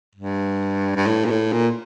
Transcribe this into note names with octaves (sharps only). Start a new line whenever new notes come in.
G2
G2
A2
A#2
A2
A#2